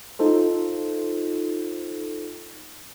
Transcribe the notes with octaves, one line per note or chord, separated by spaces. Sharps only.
D#4 F4 A4 C5